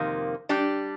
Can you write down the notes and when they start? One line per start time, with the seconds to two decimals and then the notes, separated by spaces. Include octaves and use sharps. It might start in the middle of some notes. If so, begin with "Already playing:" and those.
Already playing: F2 C3 D#3 A#3
0.49 G3 D4 G4